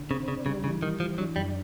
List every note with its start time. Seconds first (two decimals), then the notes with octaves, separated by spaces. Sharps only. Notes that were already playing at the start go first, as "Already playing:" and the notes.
Already playing: D3
0.10 C#3 C4
0.28 C#3 D4
0.46 C#3 G3
0.64 C#3 E3
0.82 D#3 G3
1.00 E3 F3
1.18 F#3 D4
1.36 F#2 G3